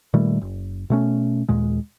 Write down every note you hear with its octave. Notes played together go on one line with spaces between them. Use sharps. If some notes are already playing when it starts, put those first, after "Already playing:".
A#2 D#3 G3 A3
F#1
B2 A3 C#4
D#2 A#2 G#3